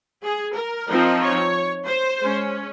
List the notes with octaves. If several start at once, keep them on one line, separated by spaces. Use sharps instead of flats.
G#4
A#4
F3 C4 D#4
C#5
C5
G#3 C#4